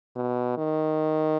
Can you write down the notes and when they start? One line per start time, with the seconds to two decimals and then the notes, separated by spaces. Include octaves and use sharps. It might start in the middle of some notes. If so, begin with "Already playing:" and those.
0.16 B2
0.57 D#3